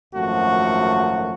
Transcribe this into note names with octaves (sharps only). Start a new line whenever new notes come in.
G#1 F#2 F3 A3 F#4